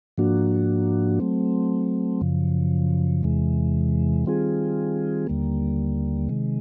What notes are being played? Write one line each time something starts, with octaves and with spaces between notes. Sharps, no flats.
G#2 F3 A#3 D4 F#4
F#3 A3 C4
F#2 C#3 F3
E2 C3 E3 G#3
D#3 G3 C4 F4 G#4
D#2 D3 G3 A#3
C3 D#3 G#3